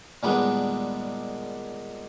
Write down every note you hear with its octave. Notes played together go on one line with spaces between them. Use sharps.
A#2 D#3 G3 G#3 B3 D4